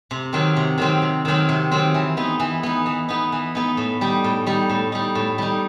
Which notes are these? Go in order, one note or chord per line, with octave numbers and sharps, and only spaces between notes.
C3
D#3 F#3 C4
C3
D#3 F#3 C4
C3
D#3 F#3 C4
C3
D#3 F#3 C4
E3
B3 D#4
E3
B3 D#4
E3
B3 D#4
E3
B3 D#4
A2
G3 D#4
A2
G3 D#4
A2
G3 D#4
A2
G3 D#4